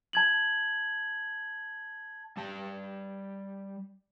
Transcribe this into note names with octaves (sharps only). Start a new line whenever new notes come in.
A5 G#6 F#7
G3 A5